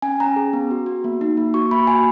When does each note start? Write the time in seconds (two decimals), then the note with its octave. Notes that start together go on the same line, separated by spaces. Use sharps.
0.02 C#4 G#5
0.20 C#4 A#5
0.36 G#4
0.53 B3
0.71 F#4
0.86 F#4
1.04 A#3
1.21 D#4
1.37 A#3
1.54 F#4 C#6
1.71 A#3 B5
1.87 F#4 G#5